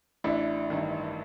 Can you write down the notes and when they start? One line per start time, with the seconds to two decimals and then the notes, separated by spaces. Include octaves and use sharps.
0.24 A1 D4 E4
0.70 G2 D#3